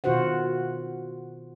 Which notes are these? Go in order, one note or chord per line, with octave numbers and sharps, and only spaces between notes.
B2 D#3 F4 F#4 C5 F#5